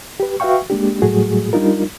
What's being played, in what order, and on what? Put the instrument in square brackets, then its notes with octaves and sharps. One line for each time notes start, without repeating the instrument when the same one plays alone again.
[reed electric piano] G4 B4
F#4 B4 E5 F5 G5 C#6
G#3 A#3 D4 G4
A2 F#3 G3 A3 F#4 G#4
G3 D4 D#4 F4 A#4